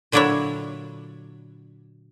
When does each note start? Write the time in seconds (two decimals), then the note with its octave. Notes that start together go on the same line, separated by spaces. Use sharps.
0.12 A#2 D3 F#3 D4 E4 C#5